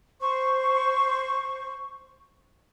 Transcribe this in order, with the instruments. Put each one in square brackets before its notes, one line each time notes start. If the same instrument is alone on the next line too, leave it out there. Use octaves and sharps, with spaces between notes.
[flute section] C5 C#6